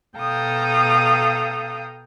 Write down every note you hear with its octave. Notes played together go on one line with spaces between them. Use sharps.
B2 A4 F5 G5 A#5 D#6